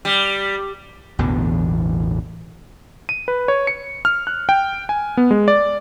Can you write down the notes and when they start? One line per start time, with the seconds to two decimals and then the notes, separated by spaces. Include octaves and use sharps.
0.05 G3
1.19 A1 E2 B2 D3
3.09 D#7
3.28 B4
3.48 C#5
3.67 C#7
4.05 F6
4.27 F#6
4.49 G5
4.89 G#5
5.17 B3
5.31 G#3
5.48 D5